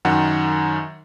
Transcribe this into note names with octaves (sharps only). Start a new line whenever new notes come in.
F#2 D#3 F#5